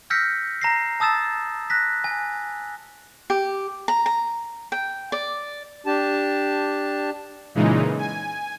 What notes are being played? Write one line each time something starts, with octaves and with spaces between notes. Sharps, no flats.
E6 F6 G6 A#6 B6 C#7
A#5 A#6 C7
A5 D#6 E6 A6 E7
F#6 A#6 B6
G#5
G4
A#5
A#5
G5
D5
D4 G4 A5
A#2 C#3 E3 G#3 D#4
G#5